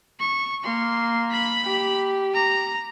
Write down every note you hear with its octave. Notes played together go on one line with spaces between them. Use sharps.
C#6
A#3 C6
B5 B6
G4
A#5